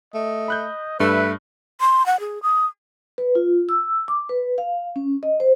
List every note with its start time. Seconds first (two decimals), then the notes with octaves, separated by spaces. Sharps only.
0.14 A3 D#5
0.48 B5 F#6 G6
1.00 G2 A3 B4 E5
1.81 C6
2.06 F#5
2.20 G#4
2.43 D#6
3.18 B4
3.35 F4
3.69 E6
4.08 D6
4.29 B4
4.58 F5
4.96 C#4
5.23 D#5
5.40 C5